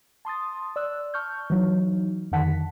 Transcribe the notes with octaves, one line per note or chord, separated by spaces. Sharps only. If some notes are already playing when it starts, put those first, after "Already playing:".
A5 C6 D#6 A6
D5 E6 F#6
A5 C#6 F6 G6
E3 F#3 D#4
F2 D3 D#3 F#5 A5 B6